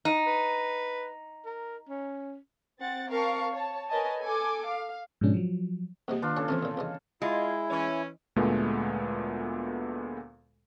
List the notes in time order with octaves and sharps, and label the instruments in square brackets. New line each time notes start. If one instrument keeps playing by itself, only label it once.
[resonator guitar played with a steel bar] D#4
[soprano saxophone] B4
A#4
C#4
[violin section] C4 F#5 A6
C4 A#4 F5 A5 C#6
C#5 A5
A#4 B4 C#5 D#5 G#5 A5
A4 G#5 D6
F5
[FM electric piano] G#2 B2 F3 G#3 C#4 D4
F3 F#3
[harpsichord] F2 C3 G#3 [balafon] A#3 G4
[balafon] D#3 [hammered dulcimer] D4 F4
[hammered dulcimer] C#3 A4 [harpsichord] C#5
[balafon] E3 C4 [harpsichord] F3 A3 C#4
[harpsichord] E2 A#2
B1 E2 G#3
[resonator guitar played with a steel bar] G#3 [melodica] E4 [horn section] F4
[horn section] E3 C#4
[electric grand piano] D2 A#2 G#3 A3 B3